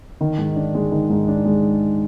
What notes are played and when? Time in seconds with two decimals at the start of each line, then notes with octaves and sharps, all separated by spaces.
0.21 D#3
0.38 G#2
0.56 D4
0.75 G#3
0.92 D#3
1.10 G#2
1.28 D4
1.45 G#3